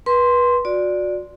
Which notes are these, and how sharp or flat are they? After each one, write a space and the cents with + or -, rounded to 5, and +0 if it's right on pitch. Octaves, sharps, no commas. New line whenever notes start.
B4 -25 C6 +0
F#4 -30 D5 +0